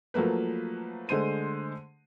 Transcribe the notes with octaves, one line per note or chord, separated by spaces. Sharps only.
F3 F#3 A3 A#3 B4
D3 G#3 A3 C5 C6 D#7